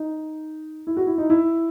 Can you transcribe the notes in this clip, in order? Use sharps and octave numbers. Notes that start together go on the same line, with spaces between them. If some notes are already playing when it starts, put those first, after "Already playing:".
Already playing: D#4
E4
F#4
E4
D#4
E4